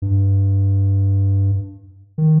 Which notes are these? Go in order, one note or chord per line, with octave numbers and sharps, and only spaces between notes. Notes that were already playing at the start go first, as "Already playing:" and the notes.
G2
D#3